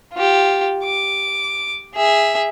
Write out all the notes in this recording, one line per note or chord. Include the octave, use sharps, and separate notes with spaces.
F4 G4
D6
G#4 E5